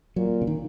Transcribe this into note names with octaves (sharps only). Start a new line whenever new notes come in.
A#2 F#3
C#3
D#3